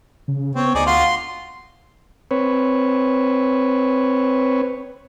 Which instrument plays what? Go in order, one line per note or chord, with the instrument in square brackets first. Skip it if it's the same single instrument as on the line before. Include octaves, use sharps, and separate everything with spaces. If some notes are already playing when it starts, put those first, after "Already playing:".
[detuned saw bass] C#3
[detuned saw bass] B3 [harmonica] C4 C#5
[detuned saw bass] D2 [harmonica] D#4 G#4 D5
[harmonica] F4 F#4 [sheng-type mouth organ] C6
[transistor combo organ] C4 B4 C#5